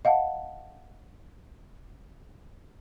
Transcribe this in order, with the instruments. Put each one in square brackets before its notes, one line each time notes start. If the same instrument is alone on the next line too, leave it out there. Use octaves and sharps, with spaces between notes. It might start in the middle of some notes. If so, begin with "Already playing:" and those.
[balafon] D#5 F5 F#5 A5